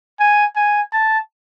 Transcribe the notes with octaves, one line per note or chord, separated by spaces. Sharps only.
G#5
G#5
A5